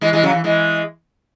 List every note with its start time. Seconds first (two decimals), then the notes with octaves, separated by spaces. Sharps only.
0.01 E3 G#3
0.13 E3 G#3
0.23 C#3 F#3
0.33 E3
0.44 E3 G#3